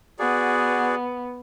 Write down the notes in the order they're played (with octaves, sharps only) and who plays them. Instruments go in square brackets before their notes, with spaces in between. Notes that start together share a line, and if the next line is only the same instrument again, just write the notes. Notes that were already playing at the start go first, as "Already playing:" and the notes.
[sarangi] B3 [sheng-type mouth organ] F#4 G#4 D5